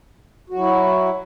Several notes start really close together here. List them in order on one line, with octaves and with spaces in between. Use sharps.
F#4 F#3 E4